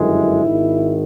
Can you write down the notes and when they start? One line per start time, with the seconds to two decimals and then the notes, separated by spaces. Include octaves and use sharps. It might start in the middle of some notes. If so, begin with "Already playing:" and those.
Already playing: G1 F#2 D#3 G#3 E4
0.44 G#1 G#2 D#3